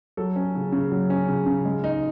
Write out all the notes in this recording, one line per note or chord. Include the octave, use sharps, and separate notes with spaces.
F#3 A4
C#4
C#3
C#3
F#3
C#4
C#3
C#3
G#3
D#4